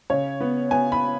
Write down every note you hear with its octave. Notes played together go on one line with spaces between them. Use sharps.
C#3 C#5
B3
B3 G#5
B5